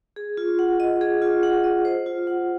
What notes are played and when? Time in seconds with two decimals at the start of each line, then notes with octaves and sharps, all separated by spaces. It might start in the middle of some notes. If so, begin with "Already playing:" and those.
0.16 G#4
0.37 F4
0.59 F#5
0.80 D#5
1.01 G#4
1.22 F4
1.43 F#5
1.64 D#5
1.85 C5
2.06 F4
2.27 F#5